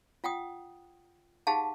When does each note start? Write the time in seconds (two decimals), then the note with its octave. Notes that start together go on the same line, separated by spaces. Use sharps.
0.24 F4 F#5 G5 D#6
1.47 D#4 G4 G#4 F5 F#5 A5